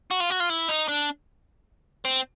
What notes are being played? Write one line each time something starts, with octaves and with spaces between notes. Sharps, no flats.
F#4
F4
F#4
F4
E4
D#4
D4
C4